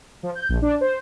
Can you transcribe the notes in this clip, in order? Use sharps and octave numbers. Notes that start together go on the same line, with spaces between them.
F3
G6
A#1
D4
C5